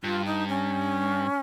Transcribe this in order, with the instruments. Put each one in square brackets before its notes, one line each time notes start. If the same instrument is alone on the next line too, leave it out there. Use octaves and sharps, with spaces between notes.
[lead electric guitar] G2 [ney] F4
[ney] D#4
C#4